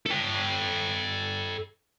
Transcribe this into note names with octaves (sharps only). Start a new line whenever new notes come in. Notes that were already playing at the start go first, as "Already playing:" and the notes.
A4 G5